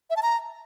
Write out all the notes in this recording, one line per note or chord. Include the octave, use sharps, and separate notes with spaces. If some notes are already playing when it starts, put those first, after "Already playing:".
E5
A5
A#5